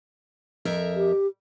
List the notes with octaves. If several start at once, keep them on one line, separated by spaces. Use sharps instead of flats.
F2 A#4 E5
G4